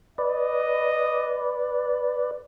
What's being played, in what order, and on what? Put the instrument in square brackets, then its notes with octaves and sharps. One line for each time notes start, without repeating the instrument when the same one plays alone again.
[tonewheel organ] B4 D5 [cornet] D#5